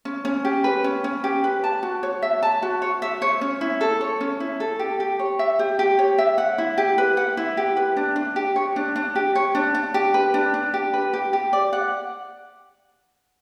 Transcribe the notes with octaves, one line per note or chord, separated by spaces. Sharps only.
C#4
C#4
G4
B4
C#4
C#4
G4
B4
A5
F#4
C#5
E5
A5
F#4
C#5
E5
C#5
C#4
E4
A4
C#5
C#4
E4
A4
G4
G4
C#5
E5
G4
G4
C#5
E5
F#5
E4
G4
B4
F#5
E4
G4
B4
D4
D4
G4
C#5
D4
D4
G4
C#5
D4
D4
G4
B4
D4
D4
G4
B4
G4
G4
D5
F#5